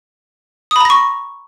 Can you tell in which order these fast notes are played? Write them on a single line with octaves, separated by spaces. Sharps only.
D#6 B5 A#5 A#6 C#6